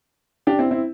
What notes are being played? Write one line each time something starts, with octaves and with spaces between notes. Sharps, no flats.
D4 G4
C4 E4
C4 E4